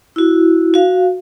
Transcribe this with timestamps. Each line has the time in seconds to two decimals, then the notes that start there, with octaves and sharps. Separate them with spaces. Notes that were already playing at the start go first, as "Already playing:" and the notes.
0.16 E4 F#4
0.74 F#4 F5